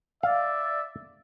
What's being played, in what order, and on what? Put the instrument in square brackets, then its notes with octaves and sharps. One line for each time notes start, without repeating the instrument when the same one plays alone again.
[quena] D5 [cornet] E5 [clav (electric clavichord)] F5